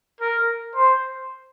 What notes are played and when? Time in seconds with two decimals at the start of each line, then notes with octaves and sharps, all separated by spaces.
0.21 A#4
0.75 C5